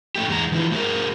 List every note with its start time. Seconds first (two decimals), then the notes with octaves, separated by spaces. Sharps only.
0.16 A2 A3 G4
0.29 E2 G#3 A#5
0.52 E3 F3 G#3 E4
0.71 A3 F#4 G#4 A#4